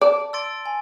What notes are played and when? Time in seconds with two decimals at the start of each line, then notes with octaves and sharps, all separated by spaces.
0.01 D5 A5
0.33 C6 E6 A6 D7
0.66 G#5